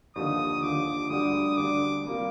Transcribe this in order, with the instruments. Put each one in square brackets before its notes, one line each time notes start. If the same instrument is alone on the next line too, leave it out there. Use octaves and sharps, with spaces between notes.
[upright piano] D#2 D3 F3 [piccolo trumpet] D#6
[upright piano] D#2 D3 F3 [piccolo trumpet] D6
[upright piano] D2 D3 G3 D4 [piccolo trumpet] D#6
[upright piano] D2 D3 G3 D4 [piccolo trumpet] D6
[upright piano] C3 G3 A#3 F4